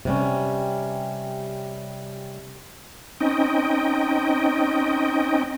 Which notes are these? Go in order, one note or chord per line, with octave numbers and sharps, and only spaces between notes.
C3 G3 C#4
C4 C#4 D#4 D#5 G5